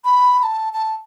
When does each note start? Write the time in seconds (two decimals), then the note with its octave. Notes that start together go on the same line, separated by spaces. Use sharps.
0.04 B5
0.39 B5
0.43 A5
0.73 A5